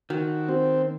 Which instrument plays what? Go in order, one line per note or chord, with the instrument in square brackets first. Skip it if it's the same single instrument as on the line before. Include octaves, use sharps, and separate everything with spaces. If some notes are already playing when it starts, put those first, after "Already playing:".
[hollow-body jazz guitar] D#3 [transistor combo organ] F#4
[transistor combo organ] C4